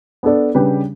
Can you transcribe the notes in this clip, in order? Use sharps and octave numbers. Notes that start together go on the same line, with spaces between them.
B3 D4 A4 D5
C#3 G3 D4 G4 B4